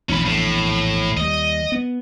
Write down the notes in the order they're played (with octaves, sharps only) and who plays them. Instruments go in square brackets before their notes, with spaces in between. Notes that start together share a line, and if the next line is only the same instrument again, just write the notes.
[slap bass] A#1 E2 [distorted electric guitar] C#4 B5
[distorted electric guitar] A2
[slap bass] D#2 G3 [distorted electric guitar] D#5
[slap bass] B3